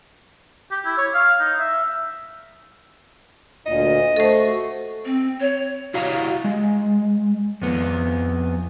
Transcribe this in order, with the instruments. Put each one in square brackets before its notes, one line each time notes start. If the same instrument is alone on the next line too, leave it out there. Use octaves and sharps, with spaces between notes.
[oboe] G4
E4
C#5
F5
D#4
E5
[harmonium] D2 A#2 [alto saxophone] D#5
[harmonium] A3 F#4 [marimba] A4 C5
[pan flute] C4
C#5
[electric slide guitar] E4 F#4 G4 F5 A#5
G#3
F2 B3